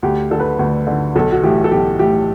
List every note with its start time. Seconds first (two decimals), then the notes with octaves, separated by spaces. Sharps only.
0.03 D2 G4
0.31 D3 A4
0.40 B4
0.59 D2
0.87 D3
1.16 B1 A4
1.32 F#4
1.43 A2 E3 G4
1.64 A4
1.71 B1 G4
1.99 A2 E3 G4